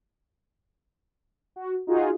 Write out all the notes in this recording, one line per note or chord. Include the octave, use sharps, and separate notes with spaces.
F#4
D#4 F4 F#4 G#4